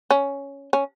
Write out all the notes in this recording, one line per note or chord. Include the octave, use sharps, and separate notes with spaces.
C#4
C#4